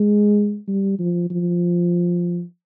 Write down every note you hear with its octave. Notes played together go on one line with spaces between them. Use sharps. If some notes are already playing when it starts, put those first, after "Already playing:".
Already playing: G#3
G3
F3
F3